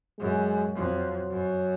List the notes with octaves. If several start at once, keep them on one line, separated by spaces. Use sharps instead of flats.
F#2 G#3
F2 F#3
F#2